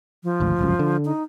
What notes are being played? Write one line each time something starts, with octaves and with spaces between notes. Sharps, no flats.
F3
G#1 D2
G1 C#2 F#2
D3
D#4